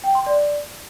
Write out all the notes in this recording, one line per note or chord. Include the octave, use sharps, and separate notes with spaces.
G5
C6
D5